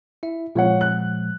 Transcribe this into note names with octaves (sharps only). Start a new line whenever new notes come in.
E4 E5
A#2 F3 G#3 F4 C#5 F#5
F#6